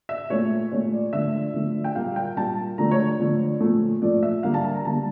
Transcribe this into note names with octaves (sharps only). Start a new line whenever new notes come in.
E5
A#2 A3 C#5
A#2 A3 C#5
D5
D3 F3 A3 E5
D3 F3 A3
G5
A#2 G3 A#3 F5
G5
A#2 G3 A#3 A5
D3 F3 A3 A#5
C#5
D3 F3 A3
A#2 F3 A3
A#2 F3 A3 D5
E5
D3 G3 A#3 F5
A5
A5
A#5
D3 G3 A#3 A5